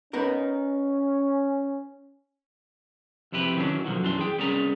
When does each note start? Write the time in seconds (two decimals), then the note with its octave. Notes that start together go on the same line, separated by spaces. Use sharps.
0.13 B3 C#4 D#4 A#4
3.32 F2 C3 E4 G4 B4
3.56 D#3 E3 F#3 A#3 C#4 D4
3.85 B2 D3 D#3 F3 F#3
4.02 F#2 E3 D4 C6
4.19 G#4 G5
4.38 C2 B3 C#4 G#4 D5 A#5